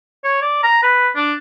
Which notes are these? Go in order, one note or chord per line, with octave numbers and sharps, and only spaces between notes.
C#5
D5
A#5
B4
D4